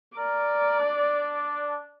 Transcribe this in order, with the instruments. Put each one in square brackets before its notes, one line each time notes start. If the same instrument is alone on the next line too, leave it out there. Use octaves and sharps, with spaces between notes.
[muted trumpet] A#4 [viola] D5
[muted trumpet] D4